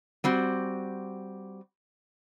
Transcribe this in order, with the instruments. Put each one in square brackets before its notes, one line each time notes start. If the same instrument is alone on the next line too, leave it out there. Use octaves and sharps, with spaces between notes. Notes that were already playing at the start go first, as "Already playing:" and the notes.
[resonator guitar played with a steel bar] G3 C4 F#4